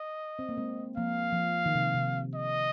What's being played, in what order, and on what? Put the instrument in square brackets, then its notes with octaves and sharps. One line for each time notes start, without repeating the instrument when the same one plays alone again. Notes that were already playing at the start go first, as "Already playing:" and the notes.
Already playing: [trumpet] D#5
[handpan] C4
A#3
G#3 C4
[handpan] F3 A#3 [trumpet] F5
[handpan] F3
D#3
C3
C3
[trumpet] D#5